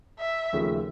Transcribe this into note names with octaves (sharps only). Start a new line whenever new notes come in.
E5
D#2 C#3 F3 A3